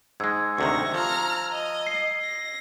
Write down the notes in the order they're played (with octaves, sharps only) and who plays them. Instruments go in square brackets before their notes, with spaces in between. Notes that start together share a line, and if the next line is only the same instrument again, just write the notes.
[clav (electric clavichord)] G#2 G#3 [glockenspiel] E6 G#6
[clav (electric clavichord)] D2 C3 D#3 [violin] C#6 A#6
[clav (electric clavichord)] F3 [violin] A#5 F6
[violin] D#5
[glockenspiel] C7
[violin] A#6